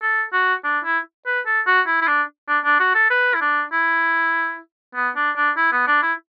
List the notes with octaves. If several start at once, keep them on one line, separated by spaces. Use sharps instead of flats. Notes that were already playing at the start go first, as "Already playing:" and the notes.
A4
F#4
D4
E4
B4
A4
F#4
E4
E4
D4
D4
D4
F#4
A4
B4
E4
D4
E4
B3
D4
D4
E4
B3
D4
E4